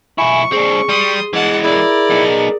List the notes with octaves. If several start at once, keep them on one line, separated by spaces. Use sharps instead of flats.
B1 E4 G#5 C#6
C4 D4 G#4
G3 C6 D#6
E3 G#3 F#5 A5
E4 G#4 A#4 D5
B3 D#4